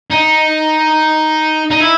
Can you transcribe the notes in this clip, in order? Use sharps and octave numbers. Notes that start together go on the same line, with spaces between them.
D#4
D#4
E4